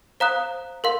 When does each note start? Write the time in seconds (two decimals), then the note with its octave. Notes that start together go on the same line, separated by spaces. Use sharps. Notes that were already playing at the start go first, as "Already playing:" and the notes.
0.20 C5 F5 A#5 D#6 F#6
0.84 A#4 F5 C6